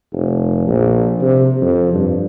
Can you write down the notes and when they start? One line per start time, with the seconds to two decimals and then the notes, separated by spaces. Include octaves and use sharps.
0.13 F1
0.66 A#1
1.21 C3
1.62 F2
1.94 G2